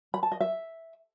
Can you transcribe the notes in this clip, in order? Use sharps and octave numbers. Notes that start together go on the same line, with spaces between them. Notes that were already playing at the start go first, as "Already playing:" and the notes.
B5
A5
D#5
E5